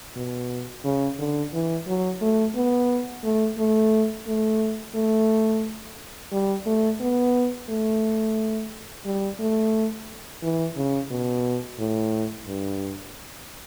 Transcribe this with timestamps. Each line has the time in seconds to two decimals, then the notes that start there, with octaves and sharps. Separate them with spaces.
0.16 B2
0.84 C#3
1.19 D3
1.53 E3
1.87 F#3
2.21 A3
2.55 B3
3.24 A3
3.58 A3
4.27 A3
4.95 A3
6.32 G3
6.66 A3
7.00 B3
7.69 A3
9.05 G3
9.40 A3
10.42 E3
10.77 C#3
11.10 B2
11.79 A2
12.47 G2